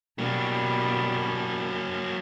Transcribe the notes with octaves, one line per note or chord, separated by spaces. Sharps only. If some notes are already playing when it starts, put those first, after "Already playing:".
B2 F#3 G3 A#3